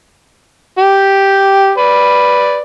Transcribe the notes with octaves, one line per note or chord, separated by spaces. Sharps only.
G4
B4 D5